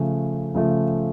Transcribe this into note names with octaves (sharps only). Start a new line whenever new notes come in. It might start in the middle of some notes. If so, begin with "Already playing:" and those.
Already playing: C#3 F3 A3
C#3 F3 A3